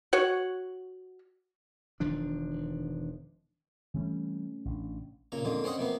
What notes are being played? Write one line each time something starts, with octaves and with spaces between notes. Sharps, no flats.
F#4 C#5 F#5
E1 D#3 F3 D4
C3 E3 F3 G3 A3 C#4
A1 D4
A#2 C#3 A#5
F2 D3 G#3 A#3
C4 C#4 C5 D#5 F#5
C3 F3 A#3 B3